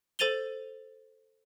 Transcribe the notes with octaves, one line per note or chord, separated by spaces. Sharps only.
A4 C5 A6 D#7 F7 G7